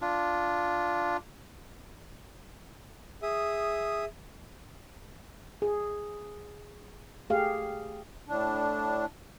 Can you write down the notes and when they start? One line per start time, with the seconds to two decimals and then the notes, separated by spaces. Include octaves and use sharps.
0.02 D4 F4
3.22 G#4 E5 D#6
5.62 G#4
7.30 A3 G4 G#4 F5
8.27 A2 D4